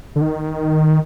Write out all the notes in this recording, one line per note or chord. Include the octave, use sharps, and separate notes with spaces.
D3
D#3